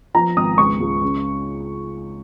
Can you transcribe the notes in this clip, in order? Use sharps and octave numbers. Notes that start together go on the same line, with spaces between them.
F3 A#5
G#1 D#6
C#2 C#6
C#2
C#3